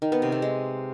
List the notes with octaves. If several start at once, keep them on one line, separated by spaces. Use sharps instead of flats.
D#3
B3
C3
A3
G#3